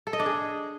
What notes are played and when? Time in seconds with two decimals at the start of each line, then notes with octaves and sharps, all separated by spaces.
0.07 A4
0.13 D#5
0.20 D4
0.26 G#4